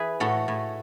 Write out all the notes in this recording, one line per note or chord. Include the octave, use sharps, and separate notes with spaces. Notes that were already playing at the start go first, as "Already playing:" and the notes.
Already playing: E3 G#4 B4
A2 F#4 A4
A2